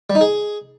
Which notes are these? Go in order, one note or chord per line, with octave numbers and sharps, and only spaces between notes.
G3
D#4
G#4